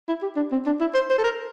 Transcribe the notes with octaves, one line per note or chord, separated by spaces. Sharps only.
E4
G4
D4
C4
D4
E4
C5
C5
A4
A#4